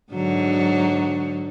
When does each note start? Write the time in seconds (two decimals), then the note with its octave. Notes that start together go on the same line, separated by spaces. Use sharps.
0.12 G#2 D3 F#3